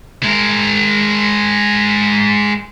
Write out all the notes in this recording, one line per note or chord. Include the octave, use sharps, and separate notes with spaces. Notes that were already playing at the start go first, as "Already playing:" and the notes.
G#3 A#4